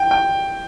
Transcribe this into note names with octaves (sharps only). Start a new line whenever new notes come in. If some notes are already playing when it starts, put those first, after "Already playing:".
Already playing: G5
G5